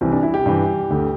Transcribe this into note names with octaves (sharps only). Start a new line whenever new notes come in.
C2 C3 E3 C4
D4
E4
G4
G2 E3
D2 D3